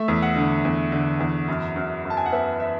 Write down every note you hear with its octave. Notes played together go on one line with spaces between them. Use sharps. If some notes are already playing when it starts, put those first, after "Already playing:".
Already playing: A3 E5
E2
F#5
D3
E2
D3
E2
F#2
F#2
F#2
A5
G#5
F#5
B3 E5
E5